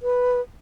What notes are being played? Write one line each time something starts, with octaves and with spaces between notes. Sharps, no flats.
B4